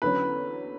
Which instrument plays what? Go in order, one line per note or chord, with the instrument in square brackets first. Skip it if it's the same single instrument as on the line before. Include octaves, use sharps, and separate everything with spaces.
[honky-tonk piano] E2 D3 F#3 C#4 [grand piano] B4